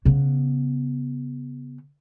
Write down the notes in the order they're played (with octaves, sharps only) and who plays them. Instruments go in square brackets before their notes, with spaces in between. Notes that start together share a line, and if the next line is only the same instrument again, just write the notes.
[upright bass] C#3 B3